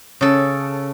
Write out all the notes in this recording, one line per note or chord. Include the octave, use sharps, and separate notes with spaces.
C#3 A4